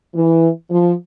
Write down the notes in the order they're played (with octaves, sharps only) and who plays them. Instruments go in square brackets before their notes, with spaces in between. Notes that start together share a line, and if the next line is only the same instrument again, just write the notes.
[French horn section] E3
F3